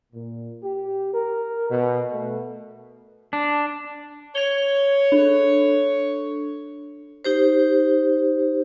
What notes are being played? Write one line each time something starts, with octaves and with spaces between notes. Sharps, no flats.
A#2
G4
A#4
B2
A3
D4
C#5 G#6 F7 G7
D4 A4
D#4 G4 C5